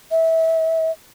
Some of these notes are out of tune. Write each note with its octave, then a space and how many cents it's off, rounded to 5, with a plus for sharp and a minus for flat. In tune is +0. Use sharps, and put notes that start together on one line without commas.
E5 -25